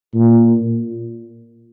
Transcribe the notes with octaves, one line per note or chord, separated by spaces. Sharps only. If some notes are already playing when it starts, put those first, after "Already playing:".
A#2